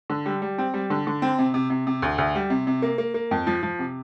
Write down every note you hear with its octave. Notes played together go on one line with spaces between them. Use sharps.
D3
G3
G3
C4
G3
D3
D3
C4
C3
C3
C3
C3
D2
D2
G3
C3
C3
A#3
A#3
A#3
F2
F3
F3
C3